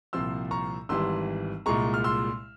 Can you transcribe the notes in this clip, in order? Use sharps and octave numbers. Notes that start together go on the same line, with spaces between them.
C2 A#2 F3 C4 C6 E6
A#5 C#6
G#1 G#2 E3 G3 C6 E6
C2 A#2 G#3 A#5 C#6
F6
C6 E6